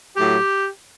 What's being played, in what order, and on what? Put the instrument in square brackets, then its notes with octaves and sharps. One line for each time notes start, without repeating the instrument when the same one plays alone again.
[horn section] A2 F#3 G4